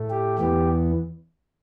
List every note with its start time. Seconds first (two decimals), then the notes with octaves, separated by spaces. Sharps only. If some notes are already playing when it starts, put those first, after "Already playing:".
Already playing: A2 A3
0.10 G4
0.39 E2 E3 B3 G4